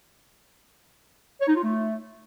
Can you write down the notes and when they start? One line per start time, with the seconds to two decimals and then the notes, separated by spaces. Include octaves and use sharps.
1.40 C#5
1.48 D#4
1.55 F4
1.63 A3